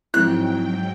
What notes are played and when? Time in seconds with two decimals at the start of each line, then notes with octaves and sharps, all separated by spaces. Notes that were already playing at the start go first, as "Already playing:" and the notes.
0.14 G#2 F3 F#3 G#3 C4 E4 G5 F#6